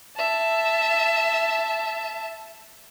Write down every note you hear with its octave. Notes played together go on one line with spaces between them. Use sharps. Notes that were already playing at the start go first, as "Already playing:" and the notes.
E5 A5